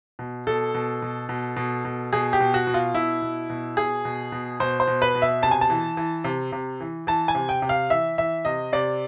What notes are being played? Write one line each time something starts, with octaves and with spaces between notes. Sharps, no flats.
B2
B2 A4
B2
B2
B2
B2
B2
B2 G#4
G4
B2
F#4
B2
F4
B2 E4
B2
B2
B2 G#4
B2
B2
B2 C5
C5
B2
B4
B2
E5
C3 A5
G#5
A5
E3
E3
C3
C3
E3
E3 A5
G#5
C3
G5
C3
F5
E3 E5
E3 E5
C3 D#5
C3 D5